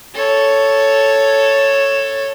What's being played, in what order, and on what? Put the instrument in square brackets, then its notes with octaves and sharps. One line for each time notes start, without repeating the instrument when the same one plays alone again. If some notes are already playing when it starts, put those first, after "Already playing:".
[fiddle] A4 C#5